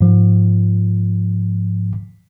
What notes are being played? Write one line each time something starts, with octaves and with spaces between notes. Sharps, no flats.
G#2 F3